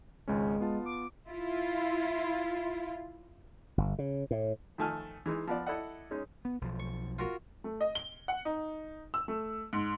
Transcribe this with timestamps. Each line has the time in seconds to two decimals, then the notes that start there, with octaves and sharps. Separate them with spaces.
0.28 G#1 C#2 G#3 C#4
0.60 B3 F4 A5
0.85 D6
1.29 E4 F4
3.78 G1
3.99 C#3
4.31 A2
4.78 D#3 F3 A3 G#5 A5 F6
5.26 E3 G#3 D#4
5.47 F3 B3 D5
5.67 E4 A4 D5 D#5 F#5
6.11 G#3 C#4 D#4
6.45 B3
6.61 B1 F3
6.80 C#6
7.19 F4 F#4 A#4
7.64 A3
7.81 D#5
7.95 G7
8.28 F#5
8.45 D#4
9.14 E6
9.28 A3
9.73 G#2